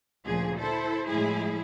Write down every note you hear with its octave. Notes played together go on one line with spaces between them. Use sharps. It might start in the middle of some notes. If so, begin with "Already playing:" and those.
D2 A#2 C#3 F3 G#4
E4 A4 C5
A2 F3 G#3 E4 G#4